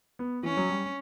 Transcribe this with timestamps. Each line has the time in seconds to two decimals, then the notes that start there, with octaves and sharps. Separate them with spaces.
0.19 B3
0.43 E3 C#4
0.57 F#3
0.70 G3